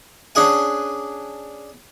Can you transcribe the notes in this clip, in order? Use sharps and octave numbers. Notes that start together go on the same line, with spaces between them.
C#4 D4 G#4 F#5 G#5